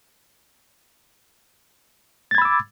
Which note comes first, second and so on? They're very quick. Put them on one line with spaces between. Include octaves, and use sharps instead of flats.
A6 G#6 B5 E6 D6